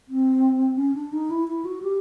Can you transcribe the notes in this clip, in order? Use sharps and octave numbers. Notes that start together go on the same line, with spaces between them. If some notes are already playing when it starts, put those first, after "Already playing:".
C4
C#4
D4
D#4
E4
E4
F#4
G4